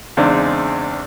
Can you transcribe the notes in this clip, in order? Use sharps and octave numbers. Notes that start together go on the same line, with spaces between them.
E2 C#3 G#3 C4 D4 D#4